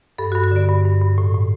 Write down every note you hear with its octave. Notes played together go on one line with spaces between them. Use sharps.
G2 A4
F#4
G2
F#4
D3 D5
G2
G2
G2
A2
A2